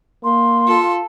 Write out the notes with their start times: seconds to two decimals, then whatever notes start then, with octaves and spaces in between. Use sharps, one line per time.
0.24 A#3 C6
0.68 F4 A4